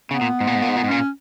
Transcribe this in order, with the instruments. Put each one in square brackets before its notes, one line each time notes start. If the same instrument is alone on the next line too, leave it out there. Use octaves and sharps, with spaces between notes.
[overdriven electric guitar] C#3 [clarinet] B3
[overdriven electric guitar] A#2
G#2
A#2
G#2
A#2
G#2
A#2
G#2
[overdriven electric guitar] A#2 [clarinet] C#4